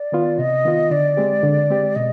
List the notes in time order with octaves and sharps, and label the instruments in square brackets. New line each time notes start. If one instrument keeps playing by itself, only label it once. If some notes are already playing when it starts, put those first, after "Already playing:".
Already playing: [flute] D5
[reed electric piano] D#3 B3 F4
[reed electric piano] C3 [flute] D#5
[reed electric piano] D#3 B3 F4
[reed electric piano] D3 [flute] D5
[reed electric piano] G#3 C4 G4
D3
G#3 C4 G4
[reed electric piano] B2 [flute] D#5